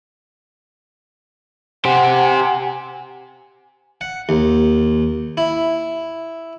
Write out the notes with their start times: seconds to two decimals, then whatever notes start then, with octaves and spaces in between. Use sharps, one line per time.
1.85 G4 C5 F#5 G#5
4.01 F#5
4.29 D#2
5.37 E4